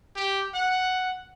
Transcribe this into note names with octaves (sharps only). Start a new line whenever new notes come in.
G4
F#5